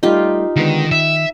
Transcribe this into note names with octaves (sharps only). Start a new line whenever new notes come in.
G3 A3 D#4 F4 G4
D3 D#3 G#3 B3
D#3 E5